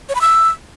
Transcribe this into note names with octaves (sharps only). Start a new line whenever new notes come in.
C#5
B5
E6